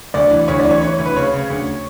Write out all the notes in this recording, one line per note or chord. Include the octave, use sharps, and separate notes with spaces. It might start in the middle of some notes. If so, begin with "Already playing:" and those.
D2 D5
E3
D2 C#5
D5
E3
C#5
E3 C#5
D2
B4
C#3 C#5
C#3
D2